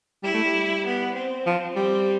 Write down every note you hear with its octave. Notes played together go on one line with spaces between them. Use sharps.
G3 E4
A3
G3
B3
C4
F3
G3 C4